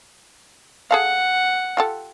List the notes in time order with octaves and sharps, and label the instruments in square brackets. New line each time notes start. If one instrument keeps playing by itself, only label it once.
[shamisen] G#4 A4 F5 [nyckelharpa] F#5
[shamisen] F4 G4 A4